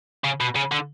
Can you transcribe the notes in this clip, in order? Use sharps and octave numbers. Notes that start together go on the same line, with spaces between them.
C#3
B2
C#3
D3